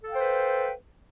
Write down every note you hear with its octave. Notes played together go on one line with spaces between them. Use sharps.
A4 B4 C5 F5 G5